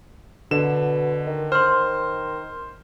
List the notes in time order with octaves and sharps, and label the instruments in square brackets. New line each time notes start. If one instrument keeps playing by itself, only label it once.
[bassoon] B2 [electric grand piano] D3 E7
[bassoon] D#3
[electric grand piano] C5 [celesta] C6 F6